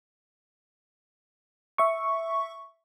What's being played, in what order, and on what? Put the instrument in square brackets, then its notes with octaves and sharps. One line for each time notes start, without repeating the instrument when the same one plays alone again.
[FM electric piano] E5 C#6